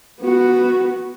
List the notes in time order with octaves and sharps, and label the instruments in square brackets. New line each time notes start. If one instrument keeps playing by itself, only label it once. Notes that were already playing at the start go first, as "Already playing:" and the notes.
[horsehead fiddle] B3 F#4